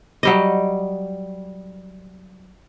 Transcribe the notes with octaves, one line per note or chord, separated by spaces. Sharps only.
F#3 G3 D#5